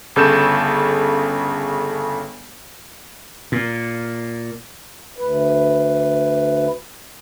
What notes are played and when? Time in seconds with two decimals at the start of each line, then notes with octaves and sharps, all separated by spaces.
0.16 G1 C#3 A4 G6 E7
3.52 A#2
5.18 D2 B4